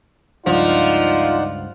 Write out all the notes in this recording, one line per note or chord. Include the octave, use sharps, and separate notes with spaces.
C#2 G2 F3 D#4 F4 D5 F#5